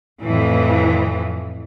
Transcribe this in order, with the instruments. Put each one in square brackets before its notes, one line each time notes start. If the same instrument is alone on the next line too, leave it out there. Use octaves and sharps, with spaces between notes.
[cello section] F2 A2 E3